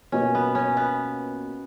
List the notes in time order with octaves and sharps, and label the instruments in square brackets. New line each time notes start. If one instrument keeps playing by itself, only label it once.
[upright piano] B2 A#3 F4 B4 D#5 [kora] C#4
[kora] B3
C#4
B3